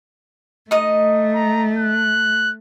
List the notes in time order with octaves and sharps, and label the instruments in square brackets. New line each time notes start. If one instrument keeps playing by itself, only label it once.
[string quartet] A3 [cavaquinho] D#4 D#5
[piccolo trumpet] A#5
F#6